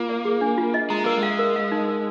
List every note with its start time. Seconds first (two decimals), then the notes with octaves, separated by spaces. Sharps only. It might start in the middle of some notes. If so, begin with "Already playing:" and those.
Already playing: A#3 F4
0.09 D5
0.25 G#4
0.41 D4
0.58 F4
0.74 D#5
0.90 G#3 A#5
1.04 A#3 A#4
1.18 G#3
1.23 F5
1.39 A#4
1.56 F5
1.72 D#4
1.88 A#4